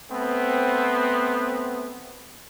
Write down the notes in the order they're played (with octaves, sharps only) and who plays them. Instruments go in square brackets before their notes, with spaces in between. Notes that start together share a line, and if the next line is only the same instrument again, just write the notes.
[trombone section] A3 B3 C4